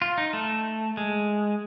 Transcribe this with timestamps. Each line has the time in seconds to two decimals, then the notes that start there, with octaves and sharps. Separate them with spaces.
0.02 F4
0.18 D#4
0.33 A3
0.97 G#3